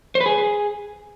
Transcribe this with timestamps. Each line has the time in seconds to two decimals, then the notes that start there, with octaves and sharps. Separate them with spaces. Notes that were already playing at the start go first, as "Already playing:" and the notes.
0.15 C5
0.21 B4
0.26 G#4